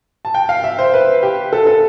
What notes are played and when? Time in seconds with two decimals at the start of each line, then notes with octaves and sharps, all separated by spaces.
0.25 A5
0.34 G5
0.49 F5
0.64 E5
0.79 C5
0.94 B4
1.23 G4
1.53 A4
1.67 A4